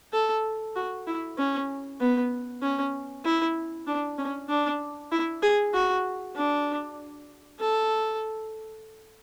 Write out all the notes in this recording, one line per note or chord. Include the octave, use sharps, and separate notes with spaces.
A4
F#4
E4
C#4
B3
C#4
E4
D4
C#4
D4
E4
G#4
F#4
D4
A4